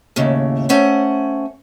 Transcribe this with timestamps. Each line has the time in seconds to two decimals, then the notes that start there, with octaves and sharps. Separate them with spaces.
0.16 D#2 A2 C#3
0.69 A3 C#4 C5 F#5